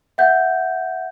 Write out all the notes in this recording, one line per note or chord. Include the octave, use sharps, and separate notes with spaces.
E5 F#5 G6